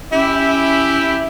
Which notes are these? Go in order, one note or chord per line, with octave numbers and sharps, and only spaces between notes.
C#4 E4 G4